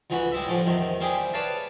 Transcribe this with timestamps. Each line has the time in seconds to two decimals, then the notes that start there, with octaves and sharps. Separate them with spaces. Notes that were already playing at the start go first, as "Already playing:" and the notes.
0.10 C#2 D3 E3 F#4 B5
0.32 G3 G#3 E5
0.47 A2 D3 F3 G3
0.66 E2 C3 D#3
1.00 G3 C4 E4 G4 G#4
1.34 B4 C#5 D5 F5 A5